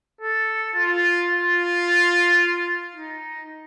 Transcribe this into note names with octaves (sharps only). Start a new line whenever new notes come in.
A4
F4
F4
D#4